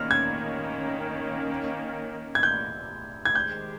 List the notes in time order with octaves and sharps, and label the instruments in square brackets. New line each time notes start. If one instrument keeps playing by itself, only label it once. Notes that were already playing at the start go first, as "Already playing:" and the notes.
Already playing: [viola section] D#3 A#3 C#4 [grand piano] F6
[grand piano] G#6
G#6
G6
G#6
[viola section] D#3 G#3 D#4 G4 C5 [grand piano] G6